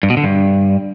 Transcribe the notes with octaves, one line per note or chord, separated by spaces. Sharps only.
G2
B2
D3
G2